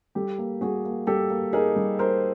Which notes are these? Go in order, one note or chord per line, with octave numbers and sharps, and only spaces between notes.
G3 G4 A4
A#3
G3 F#4 G#4
A#3
G3 G4 A4
A#3
D#4 G#4 A#4
G3
D#4 A#4 C5